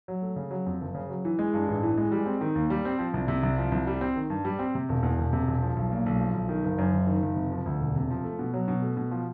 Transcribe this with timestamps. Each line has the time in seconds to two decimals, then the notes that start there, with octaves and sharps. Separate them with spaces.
0.08 F#3
0.22 A3
0.36 C#3
0.51 F#3
0.66 F2
0.81 F#1
0.94 C#3
1.10 F#3
1.25 E3
1.39 G#3
1.54 G2
1.68 A1
1.83 E3
1.98 G#3
2.12 G3
2.26 C4
2.41 D#3
2.55 D#2
2.70 G3
2.85 C4
2.99 F3
3.14 C2
3.28 C3
3.43 C2
3.58 F3
3.72 C2
3.87 G3
4.01 C4
4.16 D#3
4.30 G2
4.45 G3
4.59 C4
4.75 C3
4.89 E1
5.03 E2
5.18 E1
5.33 C3
5.47 E1
5.62 F3
5.76 B1
5.92 A#2
6.06 B1
6.21 F3
6.34 B1
6.49 D#3
6.64 F#1
6.78 F#2
6.93 F#1
7.07 D#3
7.22 F#1
7.37 C3
7.51 F3
7.66 D2
7.80 E1
7.96 C3
8.10 F3
8.24 A3
8.39 B2
8.54 F#3
8.68 B2
8.82 A3
8.97 B2
9.11 F3